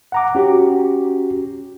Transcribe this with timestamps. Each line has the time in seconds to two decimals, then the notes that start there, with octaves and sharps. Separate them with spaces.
0.12 F#5 A#5 D6
0.35 C#4 F#4 G4